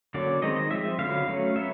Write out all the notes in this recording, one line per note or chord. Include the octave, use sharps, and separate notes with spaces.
D3 F#3 A#3 C#4 D5
D#3 G#3 C4 D#5
D#5
F3 G#3 C4 E5
D3 F#3 B3 F5
F#3 A3 C#4
F#3 B3 E5